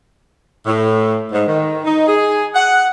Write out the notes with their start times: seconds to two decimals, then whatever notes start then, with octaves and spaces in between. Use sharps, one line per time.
0.66 A2
1.31 G#2
1.47 D#3
1.85 D#4
2.07 G#4
2.55 F#5